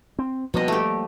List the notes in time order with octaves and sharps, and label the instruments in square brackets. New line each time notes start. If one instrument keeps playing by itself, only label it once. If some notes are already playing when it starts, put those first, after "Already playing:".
[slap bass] C4
[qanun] B2 D#5 [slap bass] F3 G3 A#3
[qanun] A3 G4